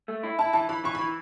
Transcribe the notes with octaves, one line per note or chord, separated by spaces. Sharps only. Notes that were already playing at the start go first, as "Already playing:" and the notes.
A3
E4
E4 A5
E3 A5
E3 B5
E3 C#6
B5
E3